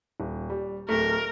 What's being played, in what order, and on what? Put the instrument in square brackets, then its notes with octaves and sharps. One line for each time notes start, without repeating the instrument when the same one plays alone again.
[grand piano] D#1
G3
[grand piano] D1 A3 [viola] A#4